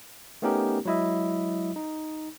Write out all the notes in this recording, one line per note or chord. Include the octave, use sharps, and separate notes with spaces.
A3 B3 C#4 D#4 G4 A#4
F#3 G#3 E4 D#5 E5
D#4